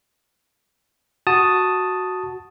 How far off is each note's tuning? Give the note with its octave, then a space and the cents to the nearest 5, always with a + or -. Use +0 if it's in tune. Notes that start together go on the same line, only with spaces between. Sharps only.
F#4 +0 A5 +0 D#6 +0